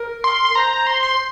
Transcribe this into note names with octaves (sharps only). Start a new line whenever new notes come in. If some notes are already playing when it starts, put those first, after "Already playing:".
Already playing: A#4
C6
C6
C6
C5 A#5
C6
C6